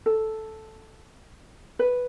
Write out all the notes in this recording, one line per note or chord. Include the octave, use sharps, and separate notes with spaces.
A4
B4